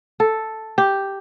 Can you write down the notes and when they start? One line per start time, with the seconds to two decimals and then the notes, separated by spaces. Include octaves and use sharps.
0.20 A4
0.78 G4